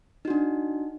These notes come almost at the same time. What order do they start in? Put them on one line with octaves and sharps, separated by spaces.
D#4 F#4 D4